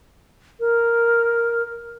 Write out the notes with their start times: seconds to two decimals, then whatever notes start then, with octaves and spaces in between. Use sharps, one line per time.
0.60 A#4